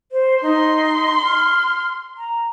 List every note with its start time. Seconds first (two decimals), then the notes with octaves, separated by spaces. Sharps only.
0.12 C5
0.43 D#4 C6
1.24 F6
2.18 A#5